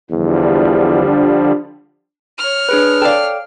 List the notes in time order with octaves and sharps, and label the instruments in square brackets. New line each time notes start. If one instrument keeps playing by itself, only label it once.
[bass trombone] E2 [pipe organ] D3 F3 G3
[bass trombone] D4
[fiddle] C#5 F6
[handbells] D4 G#4 B4
[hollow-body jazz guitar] A4 D5 [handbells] F5 G5